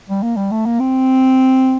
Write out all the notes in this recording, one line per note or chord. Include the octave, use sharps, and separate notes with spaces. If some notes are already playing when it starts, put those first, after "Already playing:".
G3
A#3
G3
A3
A#3
C4